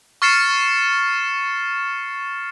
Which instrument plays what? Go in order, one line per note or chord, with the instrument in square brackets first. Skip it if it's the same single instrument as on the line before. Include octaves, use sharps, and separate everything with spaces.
[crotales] C#6 F6 A6 C7 C#7 E7